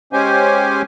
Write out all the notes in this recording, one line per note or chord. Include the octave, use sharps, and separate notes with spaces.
G#3 C#4 G4 C5 G#5